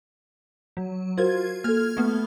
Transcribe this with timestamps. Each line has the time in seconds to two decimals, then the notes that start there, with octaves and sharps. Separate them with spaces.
0.77 F#3
1.18 F4 F#4 A#4 C5 G#6
1.64 A#3 A4 F6 G#6
1.97 A3 B3